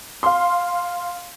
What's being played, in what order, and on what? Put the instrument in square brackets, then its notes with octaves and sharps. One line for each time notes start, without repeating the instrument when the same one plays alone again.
[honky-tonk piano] F5 C6